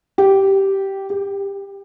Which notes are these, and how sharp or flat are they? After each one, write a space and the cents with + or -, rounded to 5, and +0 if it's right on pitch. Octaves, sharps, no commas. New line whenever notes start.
G4 -10
G4 +20